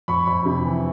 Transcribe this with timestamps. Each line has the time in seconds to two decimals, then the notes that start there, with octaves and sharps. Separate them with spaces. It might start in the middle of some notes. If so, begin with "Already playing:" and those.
0.08 F2 B5 C#6
0.27 F2
0.45 C3
0.65 E3